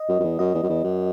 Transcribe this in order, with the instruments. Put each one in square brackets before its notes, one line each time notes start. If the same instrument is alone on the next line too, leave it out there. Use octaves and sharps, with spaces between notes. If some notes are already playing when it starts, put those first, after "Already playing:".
Already playing: [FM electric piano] D#5
[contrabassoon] F#2
F#2
E2
[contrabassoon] F#2 [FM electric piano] D#5
[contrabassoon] E2
F#2
E2
F#2